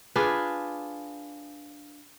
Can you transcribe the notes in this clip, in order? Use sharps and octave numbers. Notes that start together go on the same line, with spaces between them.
D4 F4 G#4 B4